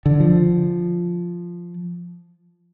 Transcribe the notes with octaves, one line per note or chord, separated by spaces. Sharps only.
D3
F3